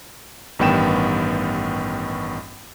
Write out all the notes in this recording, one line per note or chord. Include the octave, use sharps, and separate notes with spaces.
A1 G2 D#3 B3 G5 E7